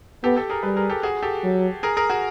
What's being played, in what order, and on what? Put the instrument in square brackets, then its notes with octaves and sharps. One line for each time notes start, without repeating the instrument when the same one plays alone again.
[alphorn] B3 [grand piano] G4 A4
[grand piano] G4 A4
G#4 A#4
[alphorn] G3 [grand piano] A4 B4
[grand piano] G#4 A#4
G4 A4
F#4 G#4
G4 A4
[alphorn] F#3
[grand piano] G#4 A#4
G#4 A#4
F#4 G#4